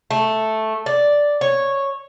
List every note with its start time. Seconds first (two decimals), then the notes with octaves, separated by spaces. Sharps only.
0.10 A3
0.86 D5
1.41 C#5